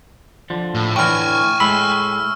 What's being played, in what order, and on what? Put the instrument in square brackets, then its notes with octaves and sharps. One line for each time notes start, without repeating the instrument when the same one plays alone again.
[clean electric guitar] D3 F3
[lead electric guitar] A2
[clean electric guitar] A2 D3 E3 [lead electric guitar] G5 G#5 [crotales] C#6 F6
[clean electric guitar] A2 G#3 B5 [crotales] E6